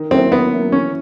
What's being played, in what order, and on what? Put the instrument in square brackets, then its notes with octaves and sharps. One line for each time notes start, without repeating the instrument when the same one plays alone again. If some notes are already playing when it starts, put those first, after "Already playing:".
Already playing: [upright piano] D#3
[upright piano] F#3 A#3 C#4 E4 [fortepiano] C4
[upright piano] D#3 [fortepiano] B3
[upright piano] F#3 A#3 C#4 E4
[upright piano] E3 [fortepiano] C#4